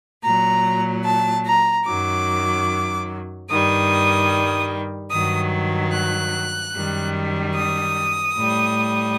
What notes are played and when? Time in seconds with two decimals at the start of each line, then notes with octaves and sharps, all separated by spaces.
0.23 A#2 F#3 A#5
1.05 A5
1.46 A#5
1.86 F#2 D#3 F#3 D6
3.49 G2 D#3 G3 D#6
5.10 G2 D#3 F#3 D#6
5.93 F#6
6.72 F#2 D#3 G3
7.55 D#6
8.35 A2 G3